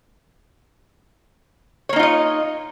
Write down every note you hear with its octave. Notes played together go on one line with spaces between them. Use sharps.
A#3 D#4 F4 C#5 D#5